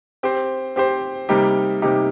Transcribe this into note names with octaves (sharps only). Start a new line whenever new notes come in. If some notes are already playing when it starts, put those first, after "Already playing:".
C4 G4 C5
C4 G4 C5
C3 G3 A#3 D#4 G4
C3 G3 A#3 D#4 G4